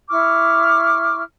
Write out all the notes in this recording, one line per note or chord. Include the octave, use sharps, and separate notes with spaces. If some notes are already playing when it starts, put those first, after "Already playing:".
E4 C#6 D6 F6